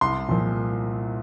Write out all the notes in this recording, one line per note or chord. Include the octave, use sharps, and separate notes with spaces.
C2 C6
A#2 F3